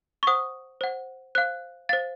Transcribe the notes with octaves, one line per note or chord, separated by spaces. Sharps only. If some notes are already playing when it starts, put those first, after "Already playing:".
C#6
C5 F#5 D#6
C5 F#5
C5 F5 F#6
C5 F5 A6